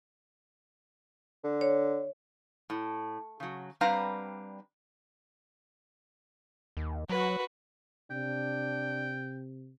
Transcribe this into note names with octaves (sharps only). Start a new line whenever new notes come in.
D3
C#5
A2
C#3 F#3
G3 C4 D4 B4 F5 A#5
D#2
F#3 F#4 B4
C3 D4 G5